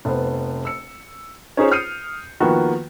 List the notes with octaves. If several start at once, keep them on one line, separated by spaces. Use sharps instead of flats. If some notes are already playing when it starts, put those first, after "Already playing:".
F1 B3 C5
E6 C#7
C#4 D#4 F4 G#4 C5 C#5
D#6 F6 G6 C7 C#7 D#7
D#3 F3 A#3 B3 F#4